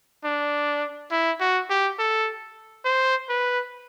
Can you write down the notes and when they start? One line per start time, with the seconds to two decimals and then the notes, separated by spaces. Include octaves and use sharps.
0.25 D4
1.12 E4
1.40 F#4
1.70 G4
1.99 A4
2.85 C5
3.29 B4